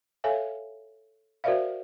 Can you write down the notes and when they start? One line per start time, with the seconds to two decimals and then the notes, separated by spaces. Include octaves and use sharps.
0.24 A4 C#5 E5 F5 G#5
1.44 F#4 A#4 C5 D5 E5 F5